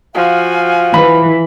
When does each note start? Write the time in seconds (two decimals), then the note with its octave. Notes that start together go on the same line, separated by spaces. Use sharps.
0.15 F3 F#4 F5 G#5
0.94 E3 B5